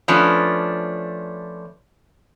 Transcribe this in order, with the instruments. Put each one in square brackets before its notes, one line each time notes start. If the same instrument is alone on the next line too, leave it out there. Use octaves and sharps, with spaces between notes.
[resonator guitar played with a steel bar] F3 A3 B3 C#4 D4